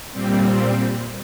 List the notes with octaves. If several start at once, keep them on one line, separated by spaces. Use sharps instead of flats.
A#2 G3 C4